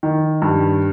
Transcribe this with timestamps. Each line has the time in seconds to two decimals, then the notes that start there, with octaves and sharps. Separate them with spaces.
0.03 D#3
0.42 G2